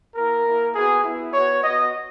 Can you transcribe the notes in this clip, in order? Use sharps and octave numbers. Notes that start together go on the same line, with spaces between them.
A#3 E4 A#4
A#3 E4
B3 F#4 G#4
B3 E4
B3 F#4 C#5
B3 F#4 D#5